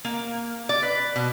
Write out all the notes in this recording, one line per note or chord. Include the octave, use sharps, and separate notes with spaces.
A#3
D5
B4
B2